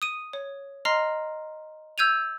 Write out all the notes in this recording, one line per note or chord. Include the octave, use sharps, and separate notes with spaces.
D#6 D#7
C#5
D#5 A#5 C6 F6 C7
E6 G6 G#6 D#7 F7